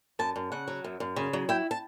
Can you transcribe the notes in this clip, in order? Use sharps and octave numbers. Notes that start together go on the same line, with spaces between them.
F#2 A5
F#2
C#3 F#5
F#3
F#2
F#2
C#3
F#3
E4 G5
A5